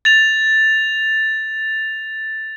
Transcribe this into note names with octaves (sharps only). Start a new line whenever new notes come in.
A6 F7